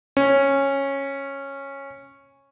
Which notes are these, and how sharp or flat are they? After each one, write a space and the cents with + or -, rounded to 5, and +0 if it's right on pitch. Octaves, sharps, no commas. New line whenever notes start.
C#4 -10